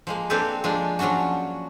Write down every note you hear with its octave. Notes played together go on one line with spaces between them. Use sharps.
F3 G#3 A#3
A#3 C4 D4 G4 A4 B4
F3 G#3 A#3 D4
F3 F#3 C#4 D4 F#4